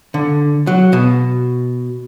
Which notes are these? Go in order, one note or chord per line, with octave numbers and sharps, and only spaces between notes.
D3
F#3
B2